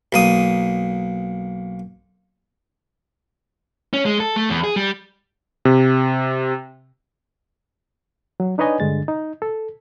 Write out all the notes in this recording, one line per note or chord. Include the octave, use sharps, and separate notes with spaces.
B1 A#3 D#6
C#4
G#3
A4
A3
E2
G#4
G3
C3
F#3
D4 D#4 B4 C#5 D#5 G#5
G2 D3 G#3 A6
D#4
A4